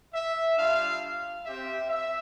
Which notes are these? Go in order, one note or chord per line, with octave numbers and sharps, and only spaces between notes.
E5
G3 D4 F4 F5
C4 G4 E5
E5